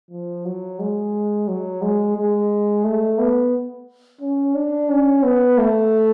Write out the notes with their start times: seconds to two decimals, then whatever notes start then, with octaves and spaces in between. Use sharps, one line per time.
0.11 F3
0.45 F#3
0.80 G#3
1.48 F#3
1.82 G#3
2.16 G#3
2.84 A3
3.18 B3
4.21 C#4
4.55 D4
4.89 C#4
5.23 B3
5.58 A3